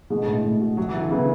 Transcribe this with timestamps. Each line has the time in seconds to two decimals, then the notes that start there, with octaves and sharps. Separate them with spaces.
0.10 B2 D3 G#3
0.27 A2
0.44 A2
0.61 F#4
0.77 F#3 F#4
0.89 E3
0.95 D3 F#4
1.10 C#3 E3 B3